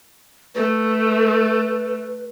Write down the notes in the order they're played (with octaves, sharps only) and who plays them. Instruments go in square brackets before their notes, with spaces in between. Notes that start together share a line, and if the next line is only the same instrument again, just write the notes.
[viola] A3 [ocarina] B4